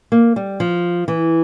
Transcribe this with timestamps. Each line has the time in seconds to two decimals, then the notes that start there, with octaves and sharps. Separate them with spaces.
0.12 A#3
0.36 G3
0.60 F3
1.08 E3